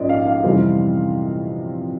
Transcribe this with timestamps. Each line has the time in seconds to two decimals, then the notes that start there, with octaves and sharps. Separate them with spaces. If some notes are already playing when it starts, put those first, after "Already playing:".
Already playing: A#1 G#2 C#4 D5 D#5
0.09 F5
0.27 F5
0.44 F2 C3 E3 G3 C4